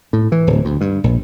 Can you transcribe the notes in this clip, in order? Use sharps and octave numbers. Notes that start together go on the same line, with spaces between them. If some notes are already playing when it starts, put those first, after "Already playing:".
A2
E3
D1
D2
G2
A#1